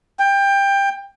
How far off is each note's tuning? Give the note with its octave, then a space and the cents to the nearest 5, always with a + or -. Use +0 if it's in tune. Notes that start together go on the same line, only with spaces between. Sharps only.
G5 +20